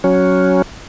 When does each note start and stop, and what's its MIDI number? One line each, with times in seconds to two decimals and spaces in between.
0.04 0.62 54
0.04 0.62 61